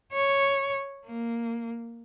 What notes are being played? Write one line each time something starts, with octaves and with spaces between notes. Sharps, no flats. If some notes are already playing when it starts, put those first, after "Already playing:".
C#5
A#3